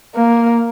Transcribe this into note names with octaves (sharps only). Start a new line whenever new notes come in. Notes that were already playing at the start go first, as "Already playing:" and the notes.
A#3